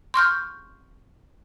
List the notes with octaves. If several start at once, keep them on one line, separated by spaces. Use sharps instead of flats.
C6 C#6 F6 G6